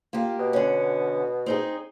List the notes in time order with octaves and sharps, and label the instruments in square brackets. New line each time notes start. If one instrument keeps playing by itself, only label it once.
[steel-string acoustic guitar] A#3 G4 [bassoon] F4
[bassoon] B2
[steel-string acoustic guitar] D3 C#4
C4 D#4 G#4